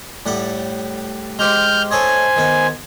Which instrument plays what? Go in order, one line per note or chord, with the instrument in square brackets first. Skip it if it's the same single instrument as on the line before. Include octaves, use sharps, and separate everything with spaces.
[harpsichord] A2 G3 F#5
[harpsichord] G#3 G4 C5 [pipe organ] F6 G6
[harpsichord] A4 C#5 D#5 [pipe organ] C5 G#5
[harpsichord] D#3 B3